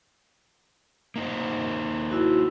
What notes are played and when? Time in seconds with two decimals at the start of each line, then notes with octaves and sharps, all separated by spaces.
1.16 A#3 D#4 C5
2.11 E4 F#4